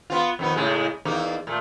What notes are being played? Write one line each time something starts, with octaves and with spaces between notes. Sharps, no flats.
B3 C4 F4
F2 D#3 B3
A2 C#3 G#3
E2 A#3 D#4
A#2 A3